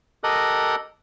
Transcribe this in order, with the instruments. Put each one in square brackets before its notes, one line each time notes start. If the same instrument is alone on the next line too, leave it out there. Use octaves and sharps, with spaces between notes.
[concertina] G4 A4 A#4 D#5 D#6 F#6